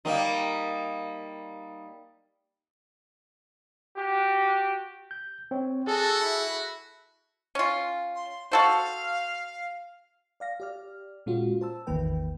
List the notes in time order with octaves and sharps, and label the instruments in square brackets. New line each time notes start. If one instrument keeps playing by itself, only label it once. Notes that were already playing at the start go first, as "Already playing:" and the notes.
[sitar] G3 A#3 D#4
[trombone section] F#4 G4
[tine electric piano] G6
C4 C#5
[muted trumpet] F#4 [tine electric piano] G#4 [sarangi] A4
[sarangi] E4
[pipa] C#4 F4
[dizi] C6
[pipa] F#4 A4 C5 [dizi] F5
[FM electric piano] D5 F5 A#6
G4 D5 F6
A#2 G#3 C#4 F4 F#4
C5 A5 E6
A1 E2 D#3 A#3 B4 G5